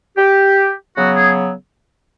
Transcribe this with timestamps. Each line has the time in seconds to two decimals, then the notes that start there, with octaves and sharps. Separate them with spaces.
0.17 G4
0.96 C#3 F#3 B3 F#4
1.16 G#4